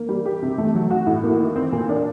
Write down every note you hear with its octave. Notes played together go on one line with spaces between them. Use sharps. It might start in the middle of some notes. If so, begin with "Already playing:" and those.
Already playing: A#3
G3
G4
C3
A3
F#3
F#4
A2
A#3
D#3
C4
A#2
D4